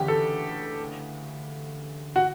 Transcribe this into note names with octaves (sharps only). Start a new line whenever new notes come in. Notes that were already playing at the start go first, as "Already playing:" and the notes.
Already playing: D2 C#3 E3 G4
A4
F#4